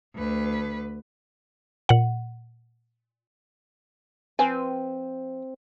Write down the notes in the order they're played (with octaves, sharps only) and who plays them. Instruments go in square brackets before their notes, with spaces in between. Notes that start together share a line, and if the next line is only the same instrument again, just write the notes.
[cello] D2 B4
[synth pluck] A#2 F#5
[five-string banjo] F3 B4 G#5 [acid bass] C4